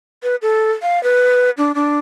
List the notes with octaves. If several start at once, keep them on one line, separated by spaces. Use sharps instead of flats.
B4
A4
F5
B4
D4
D4